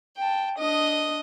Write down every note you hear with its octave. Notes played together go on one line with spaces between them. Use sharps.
G5 A5
D4 D#5 D#6